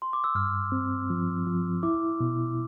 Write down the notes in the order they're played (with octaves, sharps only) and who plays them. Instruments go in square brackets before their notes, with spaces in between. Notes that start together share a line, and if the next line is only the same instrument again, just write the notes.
[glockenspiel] C6
D6
E6
[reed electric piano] G2 [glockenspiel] F6
[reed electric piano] C4
F3
F3
[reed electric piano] E4 [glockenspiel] D6
[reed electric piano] B2